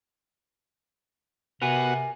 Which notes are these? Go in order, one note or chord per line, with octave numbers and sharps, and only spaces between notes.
C3 B3 F#4 A#4 F#5 G#5